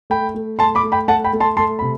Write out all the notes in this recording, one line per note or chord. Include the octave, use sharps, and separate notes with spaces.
A3 G5 B5
A3
A3 A5 C6
B5 D6
A3
G5 B5
A3 F#5 A5
G5 B5
A3
A5 C6
A3 A5 C6
C3 B5